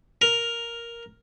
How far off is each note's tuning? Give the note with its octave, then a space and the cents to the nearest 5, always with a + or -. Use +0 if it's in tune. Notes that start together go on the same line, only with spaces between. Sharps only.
A#4 +5